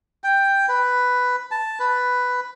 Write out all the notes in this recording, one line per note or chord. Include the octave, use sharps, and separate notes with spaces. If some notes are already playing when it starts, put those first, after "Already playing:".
G5
B4
A5
B4